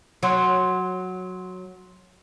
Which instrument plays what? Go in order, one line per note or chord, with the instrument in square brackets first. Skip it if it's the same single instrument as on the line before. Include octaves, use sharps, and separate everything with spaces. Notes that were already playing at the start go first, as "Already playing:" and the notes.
[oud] F#3 [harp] F#5 C6